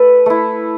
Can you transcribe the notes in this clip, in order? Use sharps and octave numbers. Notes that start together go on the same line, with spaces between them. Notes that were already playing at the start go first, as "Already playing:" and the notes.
Already playing: A3 A4 B4
A3 E4